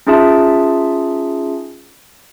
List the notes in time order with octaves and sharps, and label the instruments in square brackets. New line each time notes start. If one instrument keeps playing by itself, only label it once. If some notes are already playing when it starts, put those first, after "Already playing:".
[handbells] C#4 D#4 F4 G#4 E5 A5